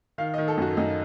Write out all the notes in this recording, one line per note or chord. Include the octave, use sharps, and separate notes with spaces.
D#3 F5
D#3 D#5
A4
F#2 F#4
F#2 D#4